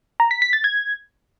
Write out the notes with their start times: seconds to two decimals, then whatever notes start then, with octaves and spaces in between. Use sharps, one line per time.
0.20 A#5
0.31 B6
0.42 B6
0.53 A6
0.64 G#6